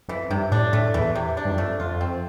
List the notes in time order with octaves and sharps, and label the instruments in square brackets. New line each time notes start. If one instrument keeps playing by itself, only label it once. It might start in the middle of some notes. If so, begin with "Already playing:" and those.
[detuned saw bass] F2 [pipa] E3
[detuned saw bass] G2 [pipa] C3
[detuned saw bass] A2 [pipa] D4
[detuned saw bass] A2 [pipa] A3
[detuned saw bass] E2 [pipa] E3
[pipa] C3
D4
[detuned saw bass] G2
F2
[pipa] A3
[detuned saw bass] F2 [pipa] F4
[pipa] C4